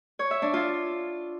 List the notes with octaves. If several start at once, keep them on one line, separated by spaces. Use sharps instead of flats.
C#5
E5
D4
F4